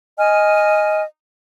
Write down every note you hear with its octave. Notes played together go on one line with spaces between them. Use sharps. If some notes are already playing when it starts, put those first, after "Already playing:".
D#5 G#5 F6